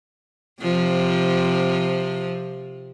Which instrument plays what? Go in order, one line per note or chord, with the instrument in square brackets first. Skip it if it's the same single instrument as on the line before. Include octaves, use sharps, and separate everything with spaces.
[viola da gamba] C3 F3